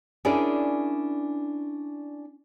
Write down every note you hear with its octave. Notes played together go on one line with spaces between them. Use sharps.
C#4 D4 E4 G#4 A#4 D5